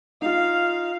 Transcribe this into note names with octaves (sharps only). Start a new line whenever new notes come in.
D#4 F4 F5